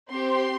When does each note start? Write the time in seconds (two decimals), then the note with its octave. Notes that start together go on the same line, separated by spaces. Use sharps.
0.10 C4 G4 C6